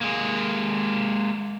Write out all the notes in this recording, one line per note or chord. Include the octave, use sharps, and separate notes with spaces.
G#3 A#3